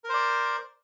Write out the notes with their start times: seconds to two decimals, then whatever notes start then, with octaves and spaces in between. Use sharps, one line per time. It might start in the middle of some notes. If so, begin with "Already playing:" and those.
0.04 A#4
0.09 C5
0.14 D5